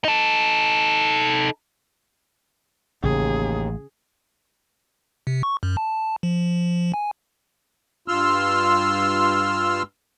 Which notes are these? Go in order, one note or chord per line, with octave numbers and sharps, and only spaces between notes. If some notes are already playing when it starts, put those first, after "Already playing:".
D#4 A4
A1 D#2 C#3 G#4
C3
C#6
F#2
A5
F3
G#5
G2 F4 C6 E6 F6